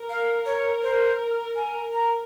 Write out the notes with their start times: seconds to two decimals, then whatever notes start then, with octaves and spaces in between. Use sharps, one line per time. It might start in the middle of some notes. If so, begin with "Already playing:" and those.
Already playing: A#4
0.09 F5
0.46 C#5
0.82 C5
1.55 G#5
1.92 A#5